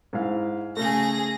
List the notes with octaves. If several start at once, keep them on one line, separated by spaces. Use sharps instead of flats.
G#2 E4 F5
C#3 A3 G#4 A#6